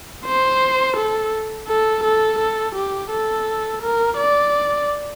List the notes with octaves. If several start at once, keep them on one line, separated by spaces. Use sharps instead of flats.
C5
A4
A4
A4
A4
G4
A4
A#4
D5